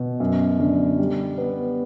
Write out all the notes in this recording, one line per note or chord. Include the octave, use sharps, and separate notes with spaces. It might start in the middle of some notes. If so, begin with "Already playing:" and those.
Already playing: B2
F#2
D3
G3
B3